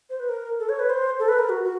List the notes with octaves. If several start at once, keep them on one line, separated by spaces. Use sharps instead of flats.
C5
B4
A#4
A4
C#5
B4
C5
A4
B4
A#4
F#4
F#4